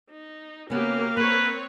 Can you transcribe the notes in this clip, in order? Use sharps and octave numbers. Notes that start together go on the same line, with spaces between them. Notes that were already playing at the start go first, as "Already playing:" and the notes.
D#4
C#3 A#3 B3 F#4 G4 A#4 F5
A#3 C4 B4 C#5